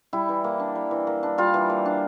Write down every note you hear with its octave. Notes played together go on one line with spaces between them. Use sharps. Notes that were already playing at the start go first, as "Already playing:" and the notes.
G3 E4
E3
A#3
D4
G3
E3
A#3
D4
G3 F4
E3
A#3
D4